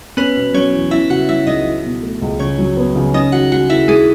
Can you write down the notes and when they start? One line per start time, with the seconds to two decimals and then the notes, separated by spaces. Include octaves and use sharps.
0.17 B3 C#4 B4
0.36 B2
0.54 F#3 C#4 C#5
0.72 E2
0.91 C#4 E4 E5
1.10 C#3 F#4 F#5
1.29 F#3 E4 E5
1.47 C#2 D#4 D#5
1.66 E4
1.84 B2
2.02 A3
2.22 C#2
2.39 C#3 C#4 C#5
2.59 F#3
2.77 B3
2.96 C#3
3.14 C#4 D#4 D#5
3.32 D#3 F#4 F#5
3.52 G#3 F#4 F#5
3.70 D#2 E4 E5
3.88 G#3 D#4 G#4